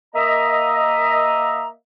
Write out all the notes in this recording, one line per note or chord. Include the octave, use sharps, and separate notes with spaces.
A#3 D#5 E5 A#5